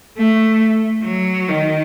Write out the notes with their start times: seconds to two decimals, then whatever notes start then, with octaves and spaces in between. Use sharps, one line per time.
0.18 A3
1.04 F#3
1.49 D#3